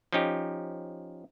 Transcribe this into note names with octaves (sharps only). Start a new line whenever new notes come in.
F3 C#4 D#4 G4